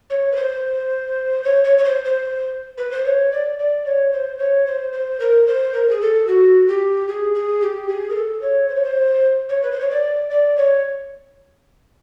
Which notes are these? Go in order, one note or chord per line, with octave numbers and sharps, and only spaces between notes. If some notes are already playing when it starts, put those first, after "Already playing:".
C#5
B4
C5
C#5
C#5
C#5
C5
C5
B4
C5
C#5
D5
D5
C#5
C5
C#5
C5
C5
A#4
C5
A#4
G#4
A4
F#4
G4
G#4
G#4
G4
G#4
A#4
A4
C#5
C5
C#5
C5
C#5
B4
C5
C#5
D5
D5
C#5